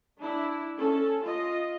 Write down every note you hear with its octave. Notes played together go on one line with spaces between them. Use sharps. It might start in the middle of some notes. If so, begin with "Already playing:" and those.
D4 E4
C#4 A4
F4 D#5